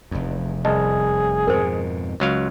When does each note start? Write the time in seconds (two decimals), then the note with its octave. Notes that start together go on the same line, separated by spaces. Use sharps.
0.11 F1 E2
0.65 C2 G#4 D#5 A5
1.47 F2 G#2 B2 A#4 C5
2.20 C#2 F#3 F5